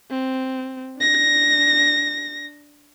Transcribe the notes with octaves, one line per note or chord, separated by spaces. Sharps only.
C4
D4 A#6